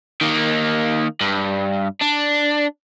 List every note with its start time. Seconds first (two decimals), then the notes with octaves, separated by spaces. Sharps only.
0.21 D#3 A#3
1.21 G2
2.01 D4